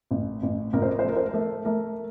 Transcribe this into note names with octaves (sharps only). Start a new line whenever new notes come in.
A1
A1
A1 A#4
C5
A#4
C5
A3 A#4
C5
A#4
A3
A3 A#4